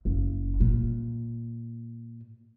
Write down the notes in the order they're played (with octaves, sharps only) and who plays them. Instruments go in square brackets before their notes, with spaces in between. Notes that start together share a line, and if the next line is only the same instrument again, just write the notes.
[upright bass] F#1
A#2